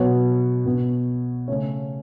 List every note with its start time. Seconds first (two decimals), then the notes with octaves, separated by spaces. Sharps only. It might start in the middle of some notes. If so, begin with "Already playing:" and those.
Already playing: B2 F#3 B3 C#5
0.66 B2 B3
1.48 C#3 A3 C#4 C#5